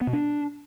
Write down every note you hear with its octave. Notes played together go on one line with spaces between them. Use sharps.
B3
B2
D4